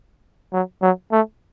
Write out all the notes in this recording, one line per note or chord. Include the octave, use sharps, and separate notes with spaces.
F#3
F#3
A3